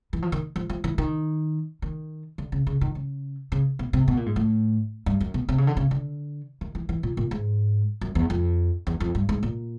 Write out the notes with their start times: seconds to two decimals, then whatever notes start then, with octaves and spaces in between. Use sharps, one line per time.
0.13 E3
0.22 F3
0.32 D#3
0.56 F3
0.70 F3
0.84 E3
0.98 D#3
1.82 D#3
2.38 D3
2.52 C#3
2.67 C#3
2.81 D#3
2.95 C#3
3.52 C#3
3.79 B2
3.93 C3
4.08 B2
4.17 A#2
4.26 G#2
4.36 A2
5.06 G2
5.20 F#2
5.34 B2
5.49 C3
5.58 C#3
5.67 D3
5.77 C#3
5.91 D3
6.61 D#3
6.75 E3
6.89 E3
7.03 A#2
7.17 A#2
7.31 G#2
8.01 F#2
8.15 E2
8.30 F2
8.87 E2
9.00 F2
9.15 G2
9.29 G#2
9.43 A#2